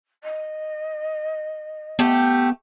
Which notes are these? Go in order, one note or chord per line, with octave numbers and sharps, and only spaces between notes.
D#5
A3 B3 G4